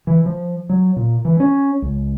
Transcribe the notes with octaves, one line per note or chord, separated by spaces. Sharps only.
E3
F3
F#3
A#2
E3
C#4
C#2